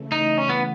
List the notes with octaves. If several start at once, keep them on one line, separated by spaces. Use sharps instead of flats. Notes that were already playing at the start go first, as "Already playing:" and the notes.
Already playing: C#3 E3 A3
D#4
C#4
B3